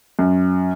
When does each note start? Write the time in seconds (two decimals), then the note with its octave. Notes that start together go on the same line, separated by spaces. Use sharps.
0.19 F#2